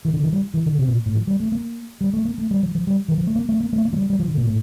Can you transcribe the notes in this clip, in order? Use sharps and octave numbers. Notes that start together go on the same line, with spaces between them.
E3
D3
E3
G3
E3
D3
C3
A#2
A2
F3
G3
A3
A#3
G3
A3
A#3
A3
G3
F3
F3
G3
E3
F3
A3
A#3
A3
A#3
A3
A#3
F3
G3
G3
F3
D3
A#2
A2